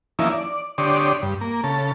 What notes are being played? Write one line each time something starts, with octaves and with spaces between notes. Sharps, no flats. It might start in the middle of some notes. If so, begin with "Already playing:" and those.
E3 F3 A#3 C#4 D#4 E4
D5
D3 G4 C#5 D5 C6 D#6
G2
A#3
C#3 A4